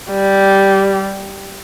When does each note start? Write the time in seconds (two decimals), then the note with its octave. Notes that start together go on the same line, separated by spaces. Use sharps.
0.12 G3